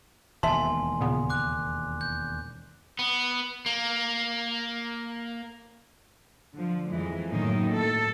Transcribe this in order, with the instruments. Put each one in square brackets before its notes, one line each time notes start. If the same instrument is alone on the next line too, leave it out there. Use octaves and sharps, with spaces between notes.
[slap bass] E1 D#2 [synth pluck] B2 [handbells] E5 A5 [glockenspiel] G#5 C6
[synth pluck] A#2 C#3 B3
[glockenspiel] D6 F#6
G6
[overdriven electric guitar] B3
A#3
[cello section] D3 F3
F2 E3 G#3
F#2 A2 D#3 A#3 D#4
A4